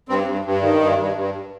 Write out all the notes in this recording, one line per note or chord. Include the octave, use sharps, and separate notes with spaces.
G2 C4
G2
G2
D#3
G2
G2
G2